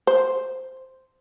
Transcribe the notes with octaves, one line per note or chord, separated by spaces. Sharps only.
C5